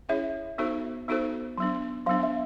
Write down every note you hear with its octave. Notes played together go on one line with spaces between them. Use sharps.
C#4 E4 G#4 C#5 E5
B3 D#4 F#4 A4 C5
B3 D#4 F#4 A4 C5
F#3 B3 D4
F#3 B3 D4 F5
E5